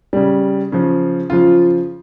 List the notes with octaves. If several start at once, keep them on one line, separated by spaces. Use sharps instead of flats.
C#3 G3
C#3 F3
C#3 F3 F4